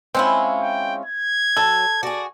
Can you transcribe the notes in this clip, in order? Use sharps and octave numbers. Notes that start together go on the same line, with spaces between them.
G#3 C4 C#4 E4 F4
G5
G#6
F#3 A4
F#4 G#4 D5